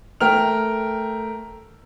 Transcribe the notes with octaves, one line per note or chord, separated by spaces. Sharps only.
A3 A#4 G5 F6 F7